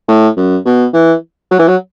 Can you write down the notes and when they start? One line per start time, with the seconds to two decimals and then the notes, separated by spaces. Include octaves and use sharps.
0.08 A2
0.37 F#2
0.65 B2
0.94 E3
1.51 F#3
1.59 E3
1.68 F#3